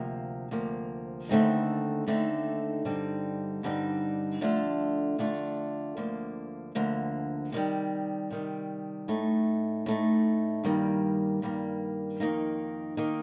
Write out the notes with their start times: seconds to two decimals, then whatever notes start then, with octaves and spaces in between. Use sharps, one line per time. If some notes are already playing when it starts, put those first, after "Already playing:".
Already playing: D2 C3 F3 A#3
0.51 D2 C3 F3 A#3
1.29 D#2 D3 A3 C4 D#4
2.07 D#2 D3 A3 C4 D#4
2.85 G2 D3 G3 C4 D#4
3.63 G2 D3 G3 C4 D#4
4.41 F2 D3 A3 D4 F4
5.18 F2 D3 A3 D4 F4
5.97 D2 D3 F3 A#3
6.75 D2 D3 F3 A#3
7.52 C3 D#3 G3
8.30 C3 D#3 G3
9.08 A2 A3 D#4
9.86 A2 A3 D#4
10.64 G2 D#3 G3 A#3
11.42 G2 D#3 G3 A#3
12.20 F2 D#3 A#3 D#4
12.97 D#3 A#3 D#4